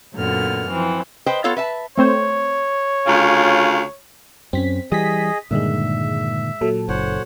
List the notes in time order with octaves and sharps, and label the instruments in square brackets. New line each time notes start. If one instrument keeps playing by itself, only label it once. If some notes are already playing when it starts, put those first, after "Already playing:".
[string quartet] F#2 A#2 D3 B3 F6
E3 F3 C4
[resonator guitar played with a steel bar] B4 C5 D#5 G5
B3 F4 A4 C#5 F5
B4 E5 A5
[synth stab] A3 C4 C5 [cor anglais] C#5
[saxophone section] D2 C#3 F4
[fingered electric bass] F#2 C#4 [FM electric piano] C4 B6
[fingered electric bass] E3 G3 [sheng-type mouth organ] G#4 D#5 [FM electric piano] D#6 B6
[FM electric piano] G2 G#3 [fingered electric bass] A#2 D3 D#3 [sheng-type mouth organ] E5
[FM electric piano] A#2 F#3 A4
[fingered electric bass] F#1 [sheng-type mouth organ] C5 C#5 F#5